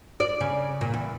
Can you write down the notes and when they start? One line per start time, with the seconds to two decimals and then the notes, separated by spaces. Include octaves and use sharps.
0.20 D5
0.41 C#3
0.81 A#2
0.94 E2